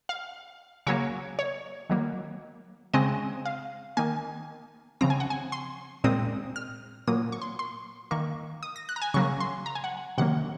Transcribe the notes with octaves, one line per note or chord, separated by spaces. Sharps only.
F5
C#3 F#3 A#3 C#5
C#5
D#3 F#3 A#3
C#3 G#3 C4 D#5
F5
D#3 A#3 G#5
C#3 F3 C4 A#5
G#5
F#5
G#5
C6
A#2 G#3 C4 D#6
F6
A#2 F#3 A#3 D#6
C#6
C6
C6
D#3 A#3 C#6
D#6
A#6
F#6
A#5
G#5
C#3 F#3 A#3 C#6
C6
A#5
G#5
F#5
C3 D#3 F#3 A#3 F#5